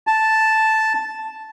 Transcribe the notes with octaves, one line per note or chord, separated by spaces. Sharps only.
A5